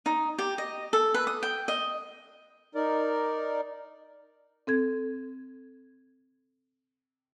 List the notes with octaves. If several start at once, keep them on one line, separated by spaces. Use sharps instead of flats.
D#4
G4
D#5
A4
B4
D#6
G5
D#5
D#4 A#4 D5
C4 A4 G#6